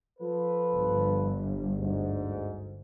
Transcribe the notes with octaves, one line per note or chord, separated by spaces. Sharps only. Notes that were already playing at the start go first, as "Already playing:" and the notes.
F3 A4 B4
G1
D2 G#2